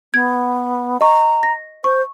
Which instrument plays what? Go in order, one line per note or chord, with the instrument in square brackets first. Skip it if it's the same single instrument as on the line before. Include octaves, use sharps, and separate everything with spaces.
[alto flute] B3 [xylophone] G#6
[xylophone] D#5 C#6 [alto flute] A#5
[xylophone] A#6
[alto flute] C5 [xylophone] C#6